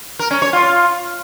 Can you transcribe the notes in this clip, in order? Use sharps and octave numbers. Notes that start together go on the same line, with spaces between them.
A#4
C#4
C#5
F4